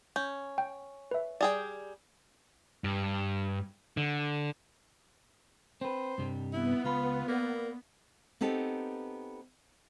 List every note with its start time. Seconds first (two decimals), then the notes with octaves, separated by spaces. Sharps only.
0.16 C#4 G6
0.58 G5
1.11 B4 E5
1.41 G3 G#4 D5 G5
2.84 G2
3.97 D3
5.81 C4 B4 C5
6.18 G2 C3 G3
6.53 B3 E4
6.85 C#2 F4 B5
7.28 A#3 A#4 D5
8.41 B3 C4 D#4 G4 A4